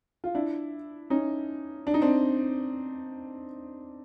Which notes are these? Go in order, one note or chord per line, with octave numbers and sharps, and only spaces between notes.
F4
D4 E4
C#4 D#4
D4
D#4
C4 D4